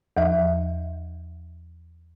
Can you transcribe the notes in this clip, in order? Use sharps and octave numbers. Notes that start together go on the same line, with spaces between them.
E2 F3 E5